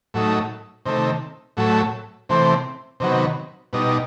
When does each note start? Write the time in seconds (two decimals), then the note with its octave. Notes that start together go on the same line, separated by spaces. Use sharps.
0.14 A2 F#3 A3 D#4
0.85 C3 D#3 A3
1.57 A2 F#3 A3
2.29 C3 E3 A3 C4
3.00 C3 D#3 F#3 B3
3.73 B2 G3 D#4